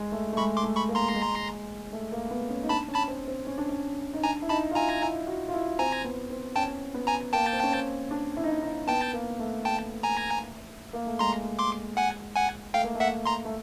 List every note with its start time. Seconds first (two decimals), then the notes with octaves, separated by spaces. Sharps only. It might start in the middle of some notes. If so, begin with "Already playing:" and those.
Already playing: G#3
0.12 A3
0.33 A3
0.37 G#3 B5 C#6
0.57 C6 D6
0.63 A3
0.76 B5 C#6
0.89 A#3
0.95 A#5 C6
1.15 G#3
1.93 A3
2.12 A#3
2.31 B3
2.50 C#4
2.63 D#4
2.69 D4 A5 B5
2.89 C#4
2.95 A5 B5
3.08 C4
3.28 C4
3.47 C#4
3.58 D4
3.69 C#4
4.14 D#4
4.23 D4 G#5 A#5
4.42 E4
4.49 D#4 A5 B5
4.71 F4
4.75 E4 G#5 A#5
5.01 E4
5.27 F#4
5.48 F4
5.53 E4
5.79 C4 G#5 A#5
6.04 B3
6.30 C4
6.56 C#4 G5 A5
6.94 B3
7.07 G#5 A#5
7.33 A#3 G5 A5
7.53 C4
7.63 C#4
7.72 C4
8.11 D4
8.37 E4
8.44 D#4
8.51 E4
8.63 D#4
8.87 B3 G5 A5
9.13 A#3
9.39 A3
9.65 G5 A5
10.03 G#5 A#5
10.93 A#3
11.07 A3
11.19 G#3 A#5 C6
11.59 C6 D6
11.97 F#5 G#5
12.36 F#5 G#5
12.74 A3 F5 G5
12.84 A#3
12.95 A3
13.00 E5 F#5
13.26 A#5 C6
13.45 A3